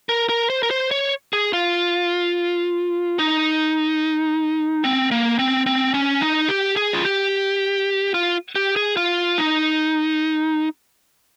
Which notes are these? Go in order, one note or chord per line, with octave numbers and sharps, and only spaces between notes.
A#4
A#4
C5
A#4
C5
C#5
G#4
F4
D#4
C4
A#3
C4
C4
C#4
D#4
G4
G#4
F4
G4
F4
G4
G#4
F4
D#4